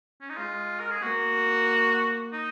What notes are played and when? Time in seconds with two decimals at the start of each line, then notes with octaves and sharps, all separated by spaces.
0.22 C#4
0.29 D#4
0.37 G#3 F4
0.80 A#4
0.91 G#4
1.03 A#3 F#4
2.33 D#4